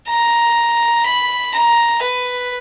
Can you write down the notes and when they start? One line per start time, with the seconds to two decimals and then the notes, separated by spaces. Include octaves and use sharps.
0.08 A#5
1.05 B5
1.54 A#5
2.02 B4